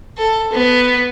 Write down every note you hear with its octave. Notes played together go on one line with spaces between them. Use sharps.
A4
B3